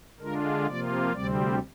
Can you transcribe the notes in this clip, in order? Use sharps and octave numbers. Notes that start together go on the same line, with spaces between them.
D3 G#3 D4 F4 A#4
C3 F3 A#3 F4 D5
D2 C3 G3 C4 D5